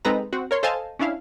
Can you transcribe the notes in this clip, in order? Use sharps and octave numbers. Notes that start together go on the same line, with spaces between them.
G#3 C4 D#4 A4 B4 A#5
C4 F#4
A#4 C#5 C6
A4 C5 D#5 F5 G#5 A5
C#4 D4 E4 F5